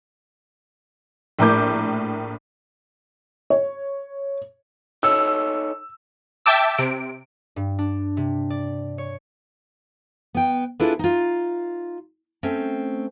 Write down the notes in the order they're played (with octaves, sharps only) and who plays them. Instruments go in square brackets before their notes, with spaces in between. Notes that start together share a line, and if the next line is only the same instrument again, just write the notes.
[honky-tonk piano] A#1 A2 A#4 D6 G6
[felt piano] C#5
[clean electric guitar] D#4 A4 C#5 [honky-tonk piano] E6
[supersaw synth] E5 G5 A5 D6 E6
C3 D7
[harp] G2
D4
C3
D5
C#5
[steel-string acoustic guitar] B3 G5
D4 E4 F4 G#4 A4 B4
D#4 F4
A3 C4 C#4